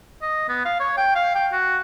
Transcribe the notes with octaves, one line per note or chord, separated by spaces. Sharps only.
D#5
B3
F5
C#5
G5
F5
G5
F#4